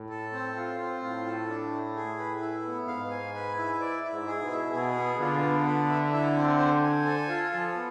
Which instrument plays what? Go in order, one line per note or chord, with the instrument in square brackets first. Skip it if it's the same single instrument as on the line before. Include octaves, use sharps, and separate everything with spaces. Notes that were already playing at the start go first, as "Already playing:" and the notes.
Already playing: [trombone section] A2
[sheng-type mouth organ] A4
C4
F4
C4
[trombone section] A2 [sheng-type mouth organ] F4
[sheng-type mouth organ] A4
D4
A3
G#4
B4
E4
B3
[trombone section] G#2 [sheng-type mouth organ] F5
[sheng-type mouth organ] G#5
B4
E4
D5
E4
[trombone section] G#2
[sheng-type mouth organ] G#4
[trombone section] B2
[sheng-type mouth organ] E4
[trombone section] B2 [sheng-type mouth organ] G#4
[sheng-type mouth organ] B3
[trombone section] D3 [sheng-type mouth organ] F4
[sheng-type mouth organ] B3
B4
E5
E4
C4
C5
G#5
A4
F4
[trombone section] F3 [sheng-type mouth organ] A4
[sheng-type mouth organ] B3